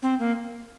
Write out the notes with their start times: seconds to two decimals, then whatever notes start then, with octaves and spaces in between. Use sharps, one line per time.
0.02 C4
0.20 A#3